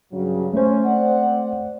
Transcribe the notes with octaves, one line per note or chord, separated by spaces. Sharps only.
G2 C#3 F#3
A3 C#4 C5
C4 D5 F#5